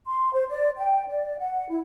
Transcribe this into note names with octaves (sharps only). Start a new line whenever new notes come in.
C6
C5
D5
G5
D5
F#5
E4